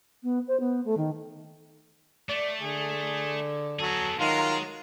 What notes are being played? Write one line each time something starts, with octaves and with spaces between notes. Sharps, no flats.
B3
C5
B3
A3
D#3
A3 D5
D3 G#4
F#3 B3 G#4 A4
D#3 F#3 G#3 F4 A#4 F5